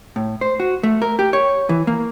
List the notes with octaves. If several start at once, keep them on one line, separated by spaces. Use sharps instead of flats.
A2
C5
F#4
A3
A#4
G4
C#5
E3
A#3